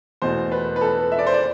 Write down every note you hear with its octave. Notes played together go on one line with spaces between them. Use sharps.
E2 B2 A3 C5
B4
B4
A4
E5
D5
C5
D5